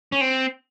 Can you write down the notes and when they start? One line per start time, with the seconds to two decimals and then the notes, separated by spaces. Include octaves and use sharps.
0.12 C#4
0.21 C4